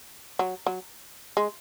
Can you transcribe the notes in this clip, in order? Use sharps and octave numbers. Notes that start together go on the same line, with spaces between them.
F#3
F#3
G#3